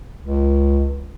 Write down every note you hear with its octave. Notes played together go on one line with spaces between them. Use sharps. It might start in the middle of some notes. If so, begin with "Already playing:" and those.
C#2